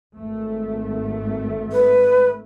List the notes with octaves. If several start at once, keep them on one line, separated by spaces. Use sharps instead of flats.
G#1 A3
B4